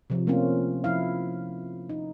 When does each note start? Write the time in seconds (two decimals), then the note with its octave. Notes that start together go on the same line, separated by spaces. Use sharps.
0.10 C3 F3
0.27 A3 A#3 C4 C#4 F4
0.84 F3 E4 F5
1.89 D#4